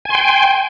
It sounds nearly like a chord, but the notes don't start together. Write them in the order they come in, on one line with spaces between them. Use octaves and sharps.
G#5 C6 G5